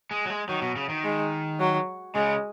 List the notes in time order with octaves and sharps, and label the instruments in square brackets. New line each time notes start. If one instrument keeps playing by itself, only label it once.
[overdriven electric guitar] G#3
F#3
G#3
[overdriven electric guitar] D#3 [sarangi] F#3
[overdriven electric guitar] B2
C#3
D#3
[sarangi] G#3
F#3
[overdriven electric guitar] C#3 [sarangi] G#3